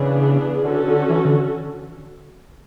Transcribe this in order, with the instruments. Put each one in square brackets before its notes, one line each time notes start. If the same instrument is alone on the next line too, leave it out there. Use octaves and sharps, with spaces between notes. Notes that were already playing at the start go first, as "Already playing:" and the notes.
Already playing: [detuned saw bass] C#3 [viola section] E3 B3 D4 G#4
[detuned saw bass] D3 [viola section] C#4 F#4 A4
[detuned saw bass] D3
E3
D3